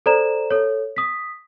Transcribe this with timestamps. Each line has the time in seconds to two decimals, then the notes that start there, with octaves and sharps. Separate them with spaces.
0.06 A4 C5 D5 A#5 E7
0.51 A4 C#5
0.96 D#6 B6